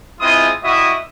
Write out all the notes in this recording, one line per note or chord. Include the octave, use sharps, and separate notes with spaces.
G#3 C4 E4 F4 C6 D#6
G3 E4 F#4 D#5 E5 D#6